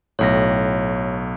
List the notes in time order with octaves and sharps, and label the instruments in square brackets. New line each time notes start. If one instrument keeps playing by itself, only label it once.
[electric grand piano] B1 A2 [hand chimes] C#5 A#6